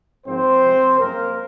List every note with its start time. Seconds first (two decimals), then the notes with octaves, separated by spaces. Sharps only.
0.26 G#2 F3 A#3 C4 C5
0.63 C3 F3 G#3
0.99 F#2 F3 G#3 A#3 A#4